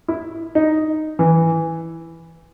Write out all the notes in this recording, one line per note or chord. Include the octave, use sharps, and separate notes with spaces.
E4
D#4
E3